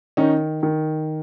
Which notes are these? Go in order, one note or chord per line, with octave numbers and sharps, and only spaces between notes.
D#3 C#4 D#4
D#3